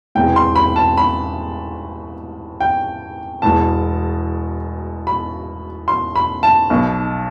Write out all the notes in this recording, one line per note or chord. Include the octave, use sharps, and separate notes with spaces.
E1 E2 C3 G5
C6
B5
A5
B5
G5
E1 E2 B2 A5
B5
C6
B5
A5
B1 B2